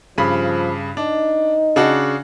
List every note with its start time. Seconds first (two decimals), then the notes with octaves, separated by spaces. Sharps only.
0.18 G2 C#3 F3 B5
0.97 D4 D#4
1.76 C#3 D4 F#4